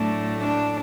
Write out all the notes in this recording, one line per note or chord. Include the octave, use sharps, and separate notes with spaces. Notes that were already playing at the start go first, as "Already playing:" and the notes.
Already playing: A2 F#3 A3 D4
D4